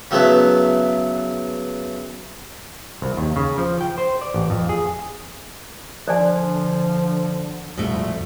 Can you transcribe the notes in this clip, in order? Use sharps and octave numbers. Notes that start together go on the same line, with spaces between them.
C#3 F#3 A3 B3 E4 B4
C2
D#2
C#3
F3
G5
C5
D5
A1
F2
G#4
D3 F3 C5 D5 G#5
C2 F2 B2 A3